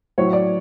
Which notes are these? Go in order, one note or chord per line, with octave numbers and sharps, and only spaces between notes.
A2 F#3 C#5
D5